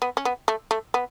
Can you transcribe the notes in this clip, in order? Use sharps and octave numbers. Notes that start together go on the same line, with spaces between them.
B3
C#4
B3
A3
A3
B3